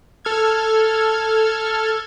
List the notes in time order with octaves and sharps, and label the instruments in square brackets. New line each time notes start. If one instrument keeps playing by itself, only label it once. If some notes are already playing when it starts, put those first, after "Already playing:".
[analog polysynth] A4 F6 G#6